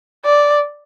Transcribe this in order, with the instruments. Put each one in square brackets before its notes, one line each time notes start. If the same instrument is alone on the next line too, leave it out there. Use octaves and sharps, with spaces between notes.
[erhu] D5